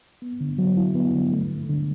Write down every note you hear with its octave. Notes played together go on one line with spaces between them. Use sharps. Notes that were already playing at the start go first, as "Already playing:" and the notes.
B3
D3
F#3
E4
B3
D3
A3
D2
D3